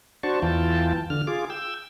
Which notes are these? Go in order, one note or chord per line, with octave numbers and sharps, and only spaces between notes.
D4 F#4 C5 A5 C#6
E2 E3 F4 G5 A5
D3 F6
F4 G#4 D6
G5 E6